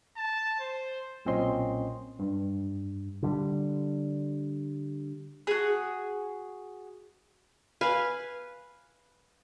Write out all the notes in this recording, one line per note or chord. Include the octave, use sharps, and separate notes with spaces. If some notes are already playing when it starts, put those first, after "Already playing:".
A5
C5
B1 A#2 C4 C#4 D#5 C6
G2
D3 G3
F#4 G#4
B4 F5 G#5